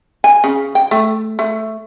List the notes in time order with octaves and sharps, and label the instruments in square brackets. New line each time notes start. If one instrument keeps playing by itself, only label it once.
[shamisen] G#5
C#3
G5
A3
A3